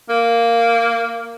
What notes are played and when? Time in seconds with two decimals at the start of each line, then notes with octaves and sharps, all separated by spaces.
0.09 A#3